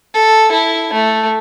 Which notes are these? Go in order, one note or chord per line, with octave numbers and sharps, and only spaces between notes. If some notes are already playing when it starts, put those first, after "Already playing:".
A4
E4
A3